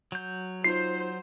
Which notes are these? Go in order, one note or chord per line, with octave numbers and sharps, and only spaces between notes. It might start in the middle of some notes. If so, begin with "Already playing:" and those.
F#3 G6
D#4 F4 C5 C7